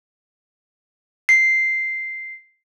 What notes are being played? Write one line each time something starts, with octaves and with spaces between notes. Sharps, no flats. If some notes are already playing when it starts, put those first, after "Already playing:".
C7